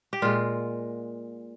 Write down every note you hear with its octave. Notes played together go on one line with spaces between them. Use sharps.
G4
A#2 G#3 F4